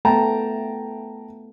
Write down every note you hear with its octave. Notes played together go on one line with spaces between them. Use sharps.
A3 B3 G5 A5 A#5